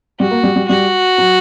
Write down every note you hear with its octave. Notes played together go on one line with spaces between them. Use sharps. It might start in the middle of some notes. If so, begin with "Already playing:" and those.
G3 F#4
A#3
G3
G3
G3 F#4
F#3